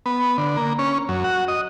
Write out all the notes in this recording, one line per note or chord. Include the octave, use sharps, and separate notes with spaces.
B3
D3
A#3
C#4
F#2
F#4
D#5